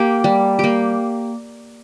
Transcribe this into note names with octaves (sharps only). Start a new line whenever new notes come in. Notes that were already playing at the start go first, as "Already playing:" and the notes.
Already playing: A#3 G4
G3
A#3 G4